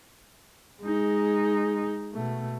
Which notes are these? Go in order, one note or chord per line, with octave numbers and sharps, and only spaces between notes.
G#3 D#4
B2 A3